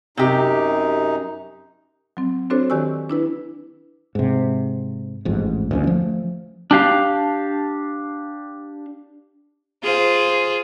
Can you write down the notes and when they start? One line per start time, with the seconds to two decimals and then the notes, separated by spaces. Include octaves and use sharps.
0.17 F#2 C3 D#4 G4
2.17 F#3 C4
2.50 C4 D4 F#4 A4 C5 C#5
2.70 D#3 G4 D5 G#5 C#6 E6
3.09 D4 E4 B4
4.15 G#2 C3
5.25 A1 F2 G#2
5.71 D2 E3 C#4
5.86 F3 A3
6.71 D4 G4 F5
9.83 F4 G#4 C5